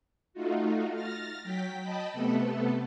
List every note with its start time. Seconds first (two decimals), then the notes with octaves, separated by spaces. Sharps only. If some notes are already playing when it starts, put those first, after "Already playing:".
0.33 A3 D#4 F4 F#4
0.92 F6 A6 A#6
1.43 F#3 G5 B6
1.81 D#5 G5 A5 B5
2.13 C3 A3 B3 A4